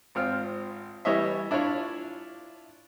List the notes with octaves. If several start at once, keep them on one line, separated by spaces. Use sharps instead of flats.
G#1 C4 F4 F6
E3 G3 C#5 D#5 E5
D4 E4 F4 C#5